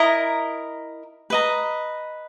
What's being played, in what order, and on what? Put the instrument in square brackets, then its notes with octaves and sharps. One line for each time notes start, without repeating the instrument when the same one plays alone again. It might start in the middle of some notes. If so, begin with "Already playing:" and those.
Already playing: [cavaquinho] E4 A#4 D#5 A#5
B4 D#5 A#5